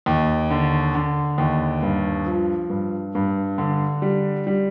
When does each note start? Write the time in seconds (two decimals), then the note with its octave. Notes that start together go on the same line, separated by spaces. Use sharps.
0.06 D#2
0.50 D3
0.95 D3
1.38 D#2
1.83 G2
2.26 F3
2.70 G2
3.15 G2
3.58 D3
4.02 G3
4.47 G3